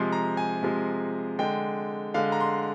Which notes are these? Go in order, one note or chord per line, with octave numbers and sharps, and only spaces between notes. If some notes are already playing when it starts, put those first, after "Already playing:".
Already playing: C3 F3 G#3 C6
A#5
G#5
C3 F3 G#3
D3 G#3 G5
D3 G#3 F5
A#5
C6